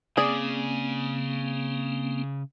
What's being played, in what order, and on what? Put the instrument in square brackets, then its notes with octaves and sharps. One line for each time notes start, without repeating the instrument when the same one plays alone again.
[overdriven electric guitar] C#3 [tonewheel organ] A#3 C4 [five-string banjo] G#4 D5